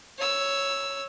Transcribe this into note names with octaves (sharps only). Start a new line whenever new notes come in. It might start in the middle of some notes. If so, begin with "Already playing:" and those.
C#5 E6